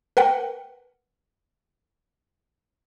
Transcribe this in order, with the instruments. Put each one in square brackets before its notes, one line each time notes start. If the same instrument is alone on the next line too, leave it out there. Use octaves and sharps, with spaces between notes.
[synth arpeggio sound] A#4 B4 F#5 G5